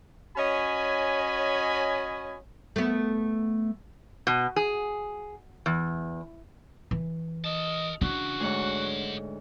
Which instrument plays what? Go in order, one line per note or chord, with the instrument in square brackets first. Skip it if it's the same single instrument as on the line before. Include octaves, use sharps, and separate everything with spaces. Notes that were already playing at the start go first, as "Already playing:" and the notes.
[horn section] C#4 F#4 C#5 D#5 G#5 B5
[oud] A3 B3
[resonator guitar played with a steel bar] B2
G#4
E2
[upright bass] E3
[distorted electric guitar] A#4 A5 [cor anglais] D#5
[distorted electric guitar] C#3 E3 [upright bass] D4 [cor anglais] F#4
[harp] D2 G#2 C#5 [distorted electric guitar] G#4 F#5